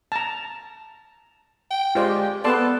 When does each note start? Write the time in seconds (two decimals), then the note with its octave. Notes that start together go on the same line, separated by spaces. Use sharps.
0.12 A5 A#5
1.70 G5
1.95 G#3 F4 G4 C5 D5
2.44 B3 A4 D5 A5 C6